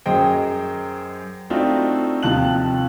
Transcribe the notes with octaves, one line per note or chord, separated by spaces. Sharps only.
F#2 F#3 G#4 C5 D#5 G5
A3 C4 D4 D#4 F4 F#4
D#2 C3 F3 A5 F#6 F#7